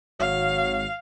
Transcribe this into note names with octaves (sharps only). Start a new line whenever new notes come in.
G#1 F#3 F5